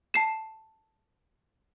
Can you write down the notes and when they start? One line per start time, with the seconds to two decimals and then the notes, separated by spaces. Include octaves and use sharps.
0.14 A5 C7 E7